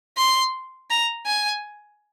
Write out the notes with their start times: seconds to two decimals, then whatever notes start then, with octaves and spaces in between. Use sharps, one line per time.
0.17 C6
0.90 A#5
1.26 G#5